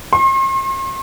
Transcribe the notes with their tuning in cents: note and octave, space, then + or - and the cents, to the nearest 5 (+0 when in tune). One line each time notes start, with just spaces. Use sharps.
C6 +45